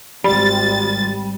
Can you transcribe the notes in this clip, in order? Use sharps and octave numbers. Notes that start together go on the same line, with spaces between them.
G#1 G3 A6